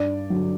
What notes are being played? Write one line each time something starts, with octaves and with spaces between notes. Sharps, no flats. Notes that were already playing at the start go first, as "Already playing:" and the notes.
Already playing: G2 D5
D3 F#3